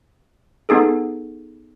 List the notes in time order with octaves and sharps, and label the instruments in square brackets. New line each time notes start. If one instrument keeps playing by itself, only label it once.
[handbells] B3 D#4 G#4 A4